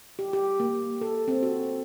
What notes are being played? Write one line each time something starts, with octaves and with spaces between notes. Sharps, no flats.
G4
G4
A#3
A4
C4
F#4